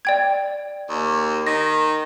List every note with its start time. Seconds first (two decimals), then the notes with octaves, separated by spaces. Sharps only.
0.05 D5 G5 G#6
0.89 D#2
1.47 D#3 A#6